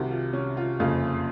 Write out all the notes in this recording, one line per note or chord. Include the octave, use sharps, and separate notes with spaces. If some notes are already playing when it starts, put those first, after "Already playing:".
Already playing: C2 C3 D#3 F#4
F4
C#4
F4
F#1 F2 C#3 F4